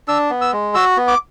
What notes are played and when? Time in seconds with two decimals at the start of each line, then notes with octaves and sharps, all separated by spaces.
0.08 D4 E6
0.30 B3
0.41 E6
0.53 G#3
0.75 F#4 E6
0.97 B3
1.08 D6